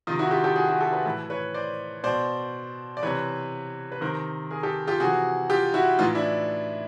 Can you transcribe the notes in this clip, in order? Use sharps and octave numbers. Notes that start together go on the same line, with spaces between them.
C3 D#3 D#4 F4
E4 F#4
F4 G4
G4 A4
F#4 G#4
F#4 G#4
G4 A4
A4 B4
A2 E3 A4 B4
B4 C#5
C5 D5
B2 C5 D5
D5
C3 E3 B4 C#5
B4
C3 D#3 A#4 C5
G#4 A#4
G4 A4
F4 G4
C3 E3 F#4 G#4
F4 G4
E4 F#4
A2 E3 D#4 F4
D4 E4